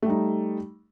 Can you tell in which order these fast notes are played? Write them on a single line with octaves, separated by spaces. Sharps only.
A3 G3 D#4